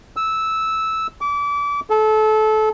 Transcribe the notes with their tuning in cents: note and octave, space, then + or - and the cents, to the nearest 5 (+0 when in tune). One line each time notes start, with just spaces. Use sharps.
E6 -10
D6 -30
A4 -25